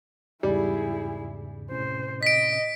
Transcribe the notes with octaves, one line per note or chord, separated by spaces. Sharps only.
E2 G#2 C#3 G3 E4 G#4
A2 C3 C#4 C5
D#5 B6 D7